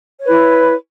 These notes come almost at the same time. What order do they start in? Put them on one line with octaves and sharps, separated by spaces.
C#5 B4 E4